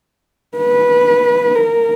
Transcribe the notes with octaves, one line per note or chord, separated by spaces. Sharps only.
B4
A#4